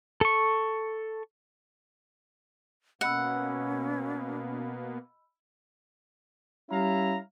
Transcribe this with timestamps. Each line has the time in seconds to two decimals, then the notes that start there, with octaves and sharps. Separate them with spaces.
0.21 A4 C#6
3.01 B2 A#3 B3 C#4 D#5 F#5 B5 E6
6.70 G3 C#4 E4 F5 A#5